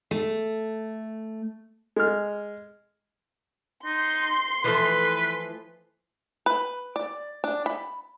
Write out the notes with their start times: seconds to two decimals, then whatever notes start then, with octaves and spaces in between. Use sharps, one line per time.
0.11 A3
1.96 G#3 F6
3.85 D#4 C6
4.64 E3 F3 A3 B4
6.46 B4
6.96 D5
7.44 D4
7.66 B5